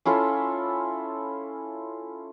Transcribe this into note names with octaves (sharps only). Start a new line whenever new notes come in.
C#4 E4 F4 A4